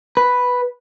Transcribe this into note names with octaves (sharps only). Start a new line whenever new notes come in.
B4